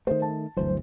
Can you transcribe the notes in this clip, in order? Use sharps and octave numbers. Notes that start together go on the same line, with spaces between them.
D#3 A3 C5
A5
G1 D2 E3 F#3 C5